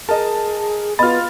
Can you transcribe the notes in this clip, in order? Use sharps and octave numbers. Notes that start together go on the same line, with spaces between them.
G#4 A#4 D#5 A5
B3 F4 D#5 B5 F6 A6